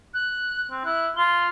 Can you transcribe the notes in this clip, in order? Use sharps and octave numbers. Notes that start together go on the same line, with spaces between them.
F#6
C4
E4 F#6
F4 G7